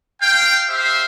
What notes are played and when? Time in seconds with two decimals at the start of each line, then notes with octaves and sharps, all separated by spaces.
0.22 F5 G5
0.69 G4 C5 E5 F5